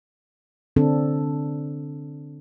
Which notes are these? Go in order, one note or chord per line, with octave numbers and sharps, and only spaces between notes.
D3 C4 D4 A4